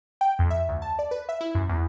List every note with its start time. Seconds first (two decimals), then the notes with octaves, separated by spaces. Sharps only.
0.21 G5
0.39 F2
0.50 E5
0.69 D2
0.82 A5
0.99 D5
1.11 B4
1.29 E5
1.41 E4
1.55 F#2
1.69 E2